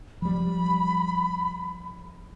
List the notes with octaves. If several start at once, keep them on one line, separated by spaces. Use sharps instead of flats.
F3 G3 B5